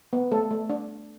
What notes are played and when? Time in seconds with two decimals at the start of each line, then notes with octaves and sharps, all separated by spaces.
0.13 B3
0.32 A3 A4
0.51 A3
0.70 D4